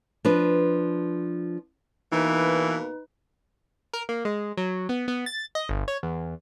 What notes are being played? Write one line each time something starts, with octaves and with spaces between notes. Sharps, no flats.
F3 D4 B4
B2 E3 A#3 D#4 B4
A#4
A#3
G#3
F#3
B3
B3
A6
D#5
G1
C#5
E2